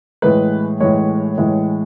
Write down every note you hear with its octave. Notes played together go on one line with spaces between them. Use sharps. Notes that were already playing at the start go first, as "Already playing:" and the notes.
A2 E3 G#3 B4
A2 E3 G#3 C#5
A2 E3 G#3